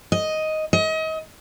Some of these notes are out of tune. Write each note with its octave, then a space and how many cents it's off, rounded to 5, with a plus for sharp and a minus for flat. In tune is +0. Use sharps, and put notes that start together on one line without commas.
D#5 +5
D#5 +35